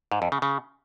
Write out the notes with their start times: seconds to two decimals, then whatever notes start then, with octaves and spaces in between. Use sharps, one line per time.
0.12 G#2
0.22 F2
0.32 C#3
0.42 C#3